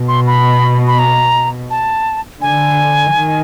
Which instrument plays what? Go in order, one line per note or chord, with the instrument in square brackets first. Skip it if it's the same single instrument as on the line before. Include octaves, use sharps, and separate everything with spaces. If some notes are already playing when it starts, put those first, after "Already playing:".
Already playing: [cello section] B2
[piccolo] C6
B5
B5
A#5
A5
[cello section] D3 [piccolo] G#5
[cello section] D#3